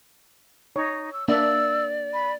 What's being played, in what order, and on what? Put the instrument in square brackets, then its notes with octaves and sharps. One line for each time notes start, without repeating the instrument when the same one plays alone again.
[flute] D#4 [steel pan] C#5
[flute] E6
[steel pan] A#3 D4 E5 [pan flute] D5 [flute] E6
[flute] B5